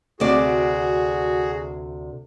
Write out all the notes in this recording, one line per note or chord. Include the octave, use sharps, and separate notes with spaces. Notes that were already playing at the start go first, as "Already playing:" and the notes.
D2 C3 F#4 G#4 D5